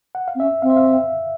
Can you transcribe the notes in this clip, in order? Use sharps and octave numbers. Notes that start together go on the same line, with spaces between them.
F#5
F5
C4
C#4 E5
C4 F5
E5
F5
E5